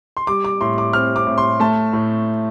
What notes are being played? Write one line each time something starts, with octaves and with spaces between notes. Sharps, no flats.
C6
G3 D6
D6
A2 C6
D6
C4 F6
D6
A2
C6
A3 A5
A2